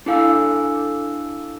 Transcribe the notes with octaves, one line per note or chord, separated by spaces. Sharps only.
D4 E4 A4 F5 G#5 E6